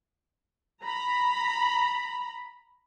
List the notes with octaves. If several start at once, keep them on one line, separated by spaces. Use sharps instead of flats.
A#5 B5